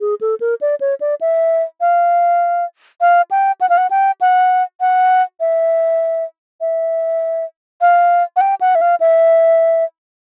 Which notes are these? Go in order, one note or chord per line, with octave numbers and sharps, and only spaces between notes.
G#4
A4
A#4
D5
C#5
D5
E5
F5
F5
G5
F#5
F5
F#5
G5
F#5
F#5
E5
E5
F5
F#5
G5
F#5
E5
F5
E5